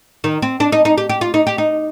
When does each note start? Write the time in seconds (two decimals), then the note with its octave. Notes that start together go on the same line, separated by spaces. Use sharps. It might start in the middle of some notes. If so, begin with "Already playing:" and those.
0.24 D#3
0.42 C4
0.60 D4
0.72 D#4
0.85 D#4
0.98 G4
1.09 G4
1.21 F4
1.34 D#4
1.47 G4
1.58 D#4